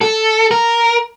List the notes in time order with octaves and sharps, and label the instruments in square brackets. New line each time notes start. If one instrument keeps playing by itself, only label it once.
[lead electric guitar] A4
A#4